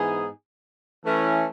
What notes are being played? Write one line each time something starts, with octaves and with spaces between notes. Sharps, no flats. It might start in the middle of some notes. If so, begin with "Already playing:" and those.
Already playing: G#2 E3 B3 D#4 G#4
E3 A3 C#4